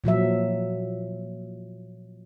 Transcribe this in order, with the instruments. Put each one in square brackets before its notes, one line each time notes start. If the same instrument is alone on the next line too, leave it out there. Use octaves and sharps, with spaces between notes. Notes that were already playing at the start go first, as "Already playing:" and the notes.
[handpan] A#2 F3 F#3 E5